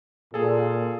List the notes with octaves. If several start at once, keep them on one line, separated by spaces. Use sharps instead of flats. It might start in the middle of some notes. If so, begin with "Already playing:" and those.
A#2 G#4 A4